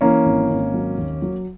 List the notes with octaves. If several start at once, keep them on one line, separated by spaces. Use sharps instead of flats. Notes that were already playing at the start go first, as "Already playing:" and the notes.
E3 A#3 C#4
G#1
G#1
F#3
D#2
F#3